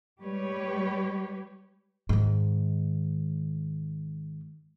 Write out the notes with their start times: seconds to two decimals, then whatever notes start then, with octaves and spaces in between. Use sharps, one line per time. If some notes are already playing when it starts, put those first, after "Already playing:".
0.21 G3 G#3 G4 B4 C#5
2.09 G#2 D#3